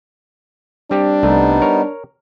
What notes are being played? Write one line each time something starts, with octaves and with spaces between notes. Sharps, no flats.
G3 C4 D4 G4
C2 G3 A3 B3 D#4
A#4 C#5